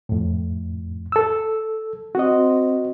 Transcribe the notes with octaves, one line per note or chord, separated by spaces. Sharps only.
F2 A2
A4 E6
C4 F#4 D#5